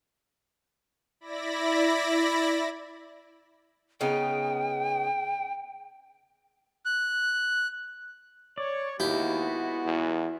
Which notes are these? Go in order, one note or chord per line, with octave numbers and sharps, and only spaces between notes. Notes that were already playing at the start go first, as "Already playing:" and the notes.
E4 D5 B5 A#6
C#3 B3 D#4 G5
F#6
C#5 D5
D#2 G#3 B3 E4 F#4 G4
E2